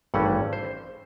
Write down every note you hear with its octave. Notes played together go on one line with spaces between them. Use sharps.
G#1 G2 E3 A3 C#4 F#5
C5